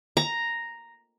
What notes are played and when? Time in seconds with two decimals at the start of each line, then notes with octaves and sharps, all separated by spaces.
0.17 A#5